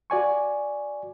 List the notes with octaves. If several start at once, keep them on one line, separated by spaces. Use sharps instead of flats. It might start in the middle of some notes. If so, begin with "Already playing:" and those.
F#4 D5 G#5 C#6